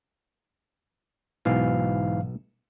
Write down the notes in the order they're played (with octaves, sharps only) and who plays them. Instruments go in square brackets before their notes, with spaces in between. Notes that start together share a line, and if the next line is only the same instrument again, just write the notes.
[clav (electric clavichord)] B1 B2 [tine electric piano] G#2 E3 F5